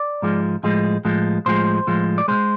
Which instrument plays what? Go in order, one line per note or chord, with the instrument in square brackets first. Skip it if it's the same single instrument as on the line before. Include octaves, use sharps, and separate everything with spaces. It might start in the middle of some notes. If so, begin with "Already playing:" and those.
Already playing: [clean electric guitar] D5
G#2 F3 G#3
A2 F3 G#3
A2 F3 G#3
A2 F3 G#3 C5
A2 F3 G#3
D5
B2 G#3 C5